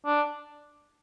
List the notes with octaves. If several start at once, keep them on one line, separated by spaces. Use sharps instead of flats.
D4